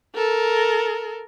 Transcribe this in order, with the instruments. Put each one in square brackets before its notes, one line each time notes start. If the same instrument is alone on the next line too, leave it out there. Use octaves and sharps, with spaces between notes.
[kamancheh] A4 A#4